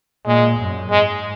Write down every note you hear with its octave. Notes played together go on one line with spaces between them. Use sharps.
A#2 G#3
F#2
G#2 G#3